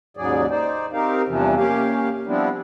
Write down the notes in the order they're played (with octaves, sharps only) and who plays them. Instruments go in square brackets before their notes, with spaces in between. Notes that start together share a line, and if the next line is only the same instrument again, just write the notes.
[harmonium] D#2 G#2 C#3 F#3 G#4 D5
D#4 C5 D5
C4 D#4 G4 A#4 F5
E2 G2 C3 E3 F3
A#3 C#4 G4 F5
F3 G3 B3 C4 D4 E4